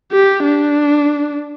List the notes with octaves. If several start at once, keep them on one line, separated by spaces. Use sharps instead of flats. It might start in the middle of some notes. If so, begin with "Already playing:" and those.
G4
D4